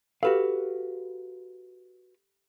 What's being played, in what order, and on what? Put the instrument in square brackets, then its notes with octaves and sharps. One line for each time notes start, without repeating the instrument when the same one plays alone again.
[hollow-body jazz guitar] F#4 B4 F5 [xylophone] G4 A4